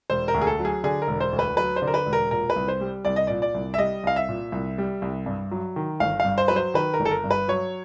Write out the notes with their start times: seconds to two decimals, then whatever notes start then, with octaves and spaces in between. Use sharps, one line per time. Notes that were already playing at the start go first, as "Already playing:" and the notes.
0.10 E1 C5
0.28 A#4
0.34 D2
0.41 G#4
0.47 A4
0.59 F#3
0.65 G#4
0.84 D3 G#4
1.02 A#4
1.08 E1
1.20 C5
1.33 D2
1.39 B4
1.57 F#3 B4
1.76 C5
1.82 D3
1.87 A#4
1.94 B4
2.06 E1
2.13 A#4
2.31 A#2 A#4
2.50 B4
2.56 C2
2.68 C5
2.81 G3
3.05 C2 D5
3.16 D#5
3.27 A#2 D5
3.42 D5
3.55 C2
3.74 E5
3.78 G3 D#5
4.04 C2 F5
4.16 E5
4.29 A#2
4.52 C2
4.78 G3
5.02 C2
5.26 G2
5.51 F#3
5.76 D#3
6.00 G1 F5
6.20 F5
6.25 G2
6.38 C5
6.48 F#3 B4
6.56 C5
6.74 D#3 B4
6.94 A#4
7.00 G1
7.05 A4
7.11 A#4
7.24 G2
7.31 B4
7.48 F#3 C#5